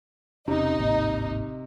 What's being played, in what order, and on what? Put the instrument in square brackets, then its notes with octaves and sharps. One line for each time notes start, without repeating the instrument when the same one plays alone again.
[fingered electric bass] E1 C#4 [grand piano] C3 [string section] D#4
[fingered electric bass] D1 G#1 A#3